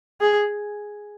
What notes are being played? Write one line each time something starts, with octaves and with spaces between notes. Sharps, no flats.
G#4